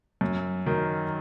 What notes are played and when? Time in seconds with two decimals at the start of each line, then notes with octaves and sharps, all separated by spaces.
0.21 F#2
0.66 D#3 F#3